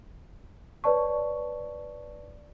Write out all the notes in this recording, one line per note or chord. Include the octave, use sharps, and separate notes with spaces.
B4 C#5 D5 A5 C#6